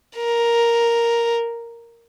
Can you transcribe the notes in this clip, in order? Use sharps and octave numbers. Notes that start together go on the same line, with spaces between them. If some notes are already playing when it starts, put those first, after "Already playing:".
A#4